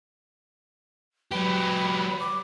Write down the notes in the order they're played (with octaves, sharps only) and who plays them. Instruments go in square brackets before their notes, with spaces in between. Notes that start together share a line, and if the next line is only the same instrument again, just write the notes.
[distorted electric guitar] F#3 G4 [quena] B4
[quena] D6